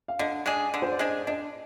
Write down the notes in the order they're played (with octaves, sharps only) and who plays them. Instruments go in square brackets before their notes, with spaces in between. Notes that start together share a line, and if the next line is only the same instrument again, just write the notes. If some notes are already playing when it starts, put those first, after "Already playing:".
[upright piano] F5
[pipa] D3 [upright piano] D#5
[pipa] G#3 D4 G#4 [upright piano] D5
[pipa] D3
[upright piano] C5
D5
[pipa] G#3 D4 G#4 [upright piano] D#5
[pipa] D4 [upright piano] D#5